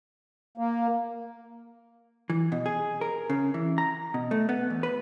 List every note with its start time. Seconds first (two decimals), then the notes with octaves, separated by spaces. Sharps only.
0.57 A#3
2.30 E3
2.52 B2
2.66 G#4
3.01 A#4
3.30 C#3
3.54 E3
3.78 A#5
4.14 B2
4.31 A3
4.49 B3
4.70 E2
4.83 B4